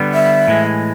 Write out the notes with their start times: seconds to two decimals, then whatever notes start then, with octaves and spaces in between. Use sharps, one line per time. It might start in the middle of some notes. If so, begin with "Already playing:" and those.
Already playing: D3 G3 B3
0.14 E5
0.48 A2 E3 G#3